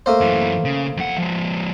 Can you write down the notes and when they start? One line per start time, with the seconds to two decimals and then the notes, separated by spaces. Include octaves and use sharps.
0.06 A3 A#3 C5
0.21 F#2 E3
0.65 C#3
0.97 F2 F#5
1.18 F3 G#3